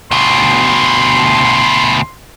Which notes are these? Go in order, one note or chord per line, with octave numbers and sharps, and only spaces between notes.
D2 B2 C6